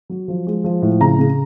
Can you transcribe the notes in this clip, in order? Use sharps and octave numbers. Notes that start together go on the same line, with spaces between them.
F#3
F3
G#3
F3
A2
C#3 A#5
C#3